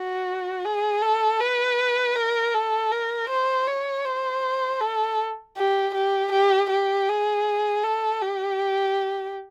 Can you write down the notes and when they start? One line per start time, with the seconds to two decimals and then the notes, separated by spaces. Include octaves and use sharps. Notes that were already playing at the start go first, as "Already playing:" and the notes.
Already playing: F#4
0.65 G#4
1.02 A4
1.40 B4
2.16 A#4
2.54 A4
2.91 A#4
3.30 C5
3.67 C#5
4.05 C5
4.81 A4
5.57 G4
5.95 G4
6.32 G4
6.70 G4
7.09 G#4
7.83 A4
8.22 G4